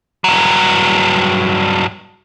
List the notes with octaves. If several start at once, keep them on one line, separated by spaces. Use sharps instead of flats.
G2 F#3